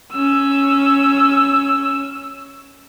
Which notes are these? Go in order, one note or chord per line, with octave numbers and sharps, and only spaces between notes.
C#4 E6